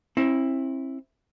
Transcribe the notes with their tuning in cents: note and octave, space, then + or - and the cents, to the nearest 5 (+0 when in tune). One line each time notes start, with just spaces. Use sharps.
C4 +40 E4 +0